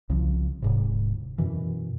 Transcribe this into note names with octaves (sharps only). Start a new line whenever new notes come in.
C2 C#3 F3
D1 G#2 C3
F#2 B2 E3